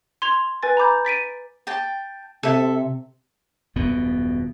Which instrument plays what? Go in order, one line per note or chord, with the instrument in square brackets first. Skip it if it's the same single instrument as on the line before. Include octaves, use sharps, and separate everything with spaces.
[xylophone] C6 G#6 F7
B4 G#5 A6
A#5 B5 D6 G6
A6 B6 D7 D#7
[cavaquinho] G5 A5
[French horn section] C3 [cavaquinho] A4 E5
[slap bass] D#1 F#2 B2 B3